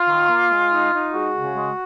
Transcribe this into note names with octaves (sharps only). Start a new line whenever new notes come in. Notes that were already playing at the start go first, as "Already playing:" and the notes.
Already playing: F4
D#3
A#3
G#3
D#4
D#4
G#3 F#4
C#3
G#3